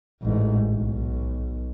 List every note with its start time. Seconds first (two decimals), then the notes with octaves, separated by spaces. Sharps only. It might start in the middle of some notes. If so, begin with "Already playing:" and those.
0.23 A1 G#2
0.75 B1